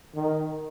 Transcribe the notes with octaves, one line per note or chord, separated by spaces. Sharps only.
D#3